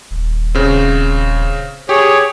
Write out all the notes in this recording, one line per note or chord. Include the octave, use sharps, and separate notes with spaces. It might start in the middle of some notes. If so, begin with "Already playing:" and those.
D#1
C#3 C4
G4 G#4 C#5